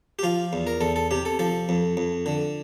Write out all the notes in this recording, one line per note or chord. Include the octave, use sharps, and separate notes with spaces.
G4
F3 F4
E2
A#4
E2 A4
A4
C3 G4
A4
F3 A4
F2
F2
D3